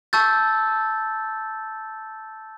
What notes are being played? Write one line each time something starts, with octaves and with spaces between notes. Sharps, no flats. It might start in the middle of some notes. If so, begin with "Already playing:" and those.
A5 C#6 E6 G6 A6